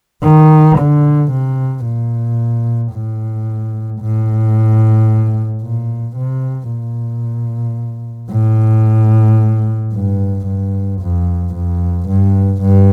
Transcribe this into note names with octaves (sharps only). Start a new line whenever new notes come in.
D#3
D3
C3
A#2
A2
A2
A#2
C3
A#2
A2
G2
G2
F2
F2
G2
G2